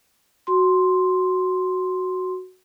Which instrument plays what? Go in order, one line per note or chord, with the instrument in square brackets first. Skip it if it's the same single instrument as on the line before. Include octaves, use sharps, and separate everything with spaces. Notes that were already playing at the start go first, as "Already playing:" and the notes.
[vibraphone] F#4 C6